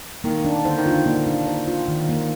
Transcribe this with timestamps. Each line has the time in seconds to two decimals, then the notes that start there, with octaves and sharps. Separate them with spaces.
0.24 D#3 A#3
0.45 D4
0.65 D3 C5
0.78 D#3
0.86 D3 F4
1.06 D3 A#3
1.27 D4
1.47 C5
1.68 F4
1.88 D#3
2.09 A#3